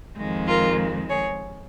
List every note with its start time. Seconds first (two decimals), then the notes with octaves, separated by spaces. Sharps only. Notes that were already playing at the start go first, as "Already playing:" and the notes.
0.17 F2 D#3 G#3
0.47 F4 A#4
1.09 G#4 C#5